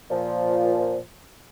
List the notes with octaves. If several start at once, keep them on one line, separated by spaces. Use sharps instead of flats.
A#2 F3